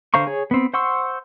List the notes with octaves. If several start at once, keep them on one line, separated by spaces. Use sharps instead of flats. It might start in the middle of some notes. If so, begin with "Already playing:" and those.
D3 C5 F5 A#5 C#6
G#4 C#5
B3 C4
C5 F#5 C6 C#6 E6